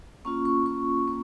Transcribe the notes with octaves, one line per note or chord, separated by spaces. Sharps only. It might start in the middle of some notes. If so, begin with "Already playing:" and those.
A#3 C#4 F4 C#6
C#6
C#6
A#3 C#6